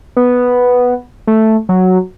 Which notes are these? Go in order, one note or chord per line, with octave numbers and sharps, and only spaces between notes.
B3
A3
F#3